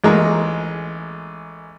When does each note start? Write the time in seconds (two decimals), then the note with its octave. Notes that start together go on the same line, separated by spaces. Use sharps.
0.04 A1 G#3 A#3 A#5